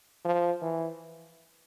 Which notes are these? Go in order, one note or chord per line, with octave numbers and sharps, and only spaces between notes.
F3
E3